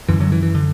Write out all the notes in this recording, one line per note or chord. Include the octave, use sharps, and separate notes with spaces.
F#2 D3 E3
D3 F#3
E3
E3
D3